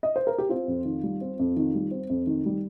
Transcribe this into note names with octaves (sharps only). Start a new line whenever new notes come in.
D#5
C5
A#4
G4
C4 F4
F2
D#3
G3
C4
F2
D#3
G3
C4
F2
D#3
G3